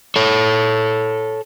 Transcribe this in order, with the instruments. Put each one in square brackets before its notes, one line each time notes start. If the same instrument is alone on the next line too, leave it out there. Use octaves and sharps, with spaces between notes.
[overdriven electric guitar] A4 C#5